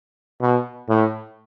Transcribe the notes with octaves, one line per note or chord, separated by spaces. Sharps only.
B2
A2